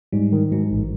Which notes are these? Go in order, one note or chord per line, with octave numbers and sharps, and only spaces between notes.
G#2 G3
D#3
G#2 F#3
A1